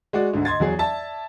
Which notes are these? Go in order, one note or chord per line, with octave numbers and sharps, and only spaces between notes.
G#3 F#4 D5
D2 G#2 D3
D#5 C6 G#6 A6
E2 F#3 G#4
D5 E5 A5